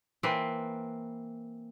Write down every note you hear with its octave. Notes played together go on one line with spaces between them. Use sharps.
E3 A#3 C4 B4